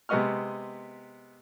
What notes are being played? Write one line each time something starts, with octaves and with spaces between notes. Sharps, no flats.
C3 G#3 B3 D#5 C#6 F6